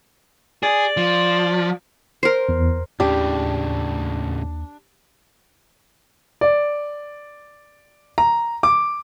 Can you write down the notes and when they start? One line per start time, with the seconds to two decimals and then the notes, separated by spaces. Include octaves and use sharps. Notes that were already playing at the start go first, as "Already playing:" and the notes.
0.63 G#4 D5
0.97 F3
2.23 A#4 C5
2.49 E2
3.00 D#2 A2 C#3 D4 G4
6.41 D5
8.18 A#5
8.63 D6